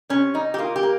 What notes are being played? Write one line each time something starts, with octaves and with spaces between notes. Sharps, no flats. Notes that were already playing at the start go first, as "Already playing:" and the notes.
C3 C#4
G3 D#4
G4
A#3 F4
G4
A#3